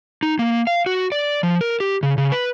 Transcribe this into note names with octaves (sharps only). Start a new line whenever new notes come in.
D#4
A#3
F5
F#4
D5
F3
A#4
G4
C#3
C#3
B4